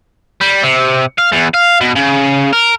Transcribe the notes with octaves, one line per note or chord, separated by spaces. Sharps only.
G3
C3
F5
E2
F5
B2
C#3
A#4